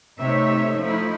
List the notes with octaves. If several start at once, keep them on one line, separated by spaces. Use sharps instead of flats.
C3 A3 D#4 C#5 E5
F3 A3 D#4 E4